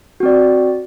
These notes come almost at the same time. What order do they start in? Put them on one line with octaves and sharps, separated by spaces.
F#4 C4 D5